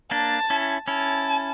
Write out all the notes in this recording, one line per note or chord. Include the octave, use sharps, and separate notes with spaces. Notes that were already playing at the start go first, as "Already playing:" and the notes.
A#3 D4 A5
C#4 E4
C#4 E4 A5